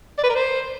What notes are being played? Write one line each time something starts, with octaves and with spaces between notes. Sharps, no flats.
D5
B4
A#4
C5